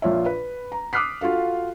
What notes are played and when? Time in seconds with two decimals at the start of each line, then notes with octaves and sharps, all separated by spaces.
0.02 A#1 A#2 F4 C#5 E5
0.26 B4
0.72 A#5
0.93 D6 D#6 F6 F#6 B6 C7
1.21 F4 F#4 A4 F5